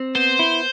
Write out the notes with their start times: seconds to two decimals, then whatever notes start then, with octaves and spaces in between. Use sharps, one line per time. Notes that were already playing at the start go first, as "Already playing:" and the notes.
Already playing: C4
0.15 B3 C5
0.39 E4